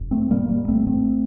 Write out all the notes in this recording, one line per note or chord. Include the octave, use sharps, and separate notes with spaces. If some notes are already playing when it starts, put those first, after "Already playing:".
Already playing: F1
A3 C4
A2 G3 A#3
G3 A#3
A#1 A3 C4
A3 C4